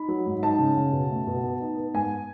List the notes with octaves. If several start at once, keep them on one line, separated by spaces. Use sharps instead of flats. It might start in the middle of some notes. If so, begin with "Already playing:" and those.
Already playing: D#4 B5
F#3
G#2
D#4 A5
C#3
C#3
B2
A3
B2
B3
D#4
B3
G#2 G#5